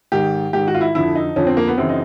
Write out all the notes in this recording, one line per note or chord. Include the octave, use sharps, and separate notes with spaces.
G#2 D#3 G4
G#2 D#3 G4
F#4
F4
E4
F2 D3 F3 E4
D#4
F2 D3 F3 C#4
C4
A#3
B3
F#2 C#3 E3 C4
D#4